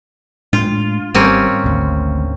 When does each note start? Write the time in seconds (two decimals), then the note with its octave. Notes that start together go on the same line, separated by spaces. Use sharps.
0.53 A2 G#3 D4 F4
1.14 G#1 G3 A#3 C4 C#4
1.64 G#1 D2